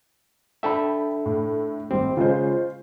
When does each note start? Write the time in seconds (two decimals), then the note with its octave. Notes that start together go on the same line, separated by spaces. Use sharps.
0.63 D4 A4 E5 G5 B5
1.26 A2
1.91 G#1 G3 C4
2.17 C#3 G#3 F4 C5